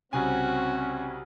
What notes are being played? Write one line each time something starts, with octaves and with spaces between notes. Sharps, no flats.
C2 C#3 C4 C#4 F#4 G#5